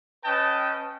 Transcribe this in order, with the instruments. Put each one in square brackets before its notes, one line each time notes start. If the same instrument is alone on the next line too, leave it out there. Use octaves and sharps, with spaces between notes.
[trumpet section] C#4 B4 D#5 G5 A5